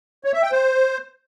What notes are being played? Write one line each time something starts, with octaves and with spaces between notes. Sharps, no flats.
C#5
E5
G5
C5